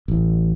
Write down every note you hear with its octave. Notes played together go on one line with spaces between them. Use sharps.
A1